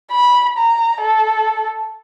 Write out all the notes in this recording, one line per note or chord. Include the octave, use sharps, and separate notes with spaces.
B5
A#5
A4